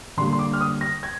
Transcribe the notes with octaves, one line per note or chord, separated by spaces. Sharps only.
D3 G3 A#3 C6
C6
D6
F6
D#6
A#6
G#6